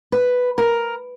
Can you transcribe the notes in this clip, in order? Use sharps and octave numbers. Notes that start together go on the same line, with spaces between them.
B4
A#4